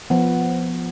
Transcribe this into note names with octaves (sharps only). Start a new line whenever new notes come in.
F3 B3